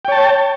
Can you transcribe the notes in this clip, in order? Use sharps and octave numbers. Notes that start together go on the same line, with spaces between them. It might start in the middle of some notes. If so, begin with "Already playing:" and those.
C#5 G5 A5